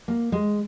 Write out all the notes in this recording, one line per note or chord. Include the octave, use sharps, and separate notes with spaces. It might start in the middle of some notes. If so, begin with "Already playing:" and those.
A#3
G#3